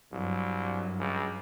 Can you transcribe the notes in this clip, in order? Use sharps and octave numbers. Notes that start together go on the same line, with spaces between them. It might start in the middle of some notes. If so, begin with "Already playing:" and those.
C2 G2 F#3
C#2